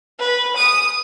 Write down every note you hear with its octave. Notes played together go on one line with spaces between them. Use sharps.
B4
D#6